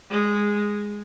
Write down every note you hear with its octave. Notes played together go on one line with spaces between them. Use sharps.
G#3